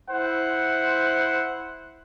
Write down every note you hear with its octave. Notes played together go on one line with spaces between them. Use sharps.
E4 C5 F#5